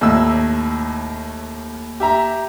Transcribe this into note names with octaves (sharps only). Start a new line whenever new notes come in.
D#2 A2 E6
G4 E5 A#5